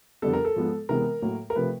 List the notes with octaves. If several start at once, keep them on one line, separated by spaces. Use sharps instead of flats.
F2 D3 G3 B3 A4
A#4
A4
G#2 F3 G#3 B3
C3 E3 G#3 B3 A#4
A2 F#3 A#3
A#4
C3 F3 A3 B4